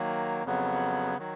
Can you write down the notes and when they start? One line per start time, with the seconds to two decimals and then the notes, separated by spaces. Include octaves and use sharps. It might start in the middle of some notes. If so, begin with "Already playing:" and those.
Already playing: D#3 F#3 A#3
0.44 F2 C#3 F#3 B3
1.19 D#3 F#3